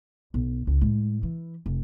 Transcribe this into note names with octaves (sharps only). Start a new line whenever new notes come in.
B1
C#2
A2 G#3
E3
F1